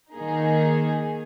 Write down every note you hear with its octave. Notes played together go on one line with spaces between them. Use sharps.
D#3 A#3 D#4 G#4